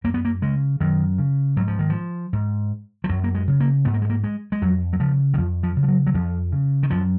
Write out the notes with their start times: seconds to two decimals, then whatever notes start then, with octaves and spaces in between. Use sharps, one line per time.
0.04 F#2 A#3
0.14 B3
0.25 A#3
0.42 C#3 G#3
0.80 F#2 D#3
1.18 C#3
1.56 G#2 F#3
1.68 F3
1.79 D#3
1.90 F3
2.33 G#2
3.04 F3
3.09 F#2 F#3
3.24 A#3
3.35 G#3
3.48 C#3
3.60 A#3
3.85 G#2 B3
3.94 A#3
4.02 G#3
4.10 A#3
4.23 G#3
4.52 G#3
4.61 F2 F#3
4.93 F#3
5.00 C#3 F3
5.34 D#3
5.38 F2 F3
5.63 F3
5.76 C#3
5.83 F3
5.88 F#3
6.07 F#3
6.14 F2 F3
6.52 C#3
6.83 D#3
6.90 F#2 F3